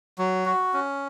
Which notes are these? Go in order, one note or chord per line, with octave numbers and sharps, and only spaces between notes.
F#3
F#4
C#4